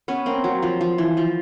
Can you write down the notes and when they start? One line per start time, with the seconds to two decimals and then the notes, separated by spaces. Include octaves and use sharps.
0.08 B3 C#4
0.26 A#3 C4
0.44 F#3
0.62 F3
0.81 F3
0.98 E3
1.17 F3